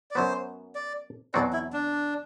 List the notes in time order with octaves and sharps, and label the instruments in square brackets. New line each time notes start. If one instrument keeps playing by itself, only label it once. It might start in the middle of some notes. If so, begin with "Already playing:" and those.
[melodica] D5
[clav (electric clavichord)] F#2 F#3 B3 [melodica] C5
[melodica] D5
[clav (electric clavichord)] E2 B2 F#3 C4 F#4 [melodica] D5
[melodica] E4
D4